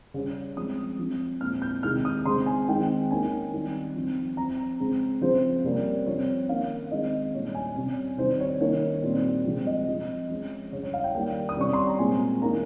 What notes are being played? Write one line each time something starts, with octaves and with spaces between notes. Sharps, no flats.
C#3 G3 C#4
F3 G#3 C4 D#6
F3 C4
A#2 G#3 C4 F6
G6
C3 D#3 G#3 F6
D#6
C#3 G#3 C4 C6
G#5
D#3 G#3 C4 G5
D#3 A#3 C#4 G#5
D#3 G3 C4
F3 C4
F3 C4 A#5
C#3 G#3 C4
C#3 F3 C4 C5
C3 G3 A#3 C#4
F3 C4 C#5
D#3 A#3 C#4 F5
D#3 G#3 C4 D#5
A#2 G3 C#4 C#5
G#5
C3 G3 C#4 C#5
C3 D#3 G3 C4 C5
C#5
D#3 A#3 C#4 C#5
A#2 G3 C4
C3 F3 G#3 C4
D#5
F3 C4
F3 G#3 C#4
C#3 G3 C#4 C#5
C#5
F5
G5
D#3 G3 A#3 G5
D#6
C3 G3 C#4 C#6
C6
A#5
A#2 G#3 C4 G#5
D#3 G3 A#3 C#4 A#5